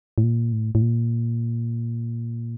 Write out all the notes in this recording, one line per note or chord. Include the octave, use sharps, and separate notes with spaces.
A2
A#2
A2
A2
A#2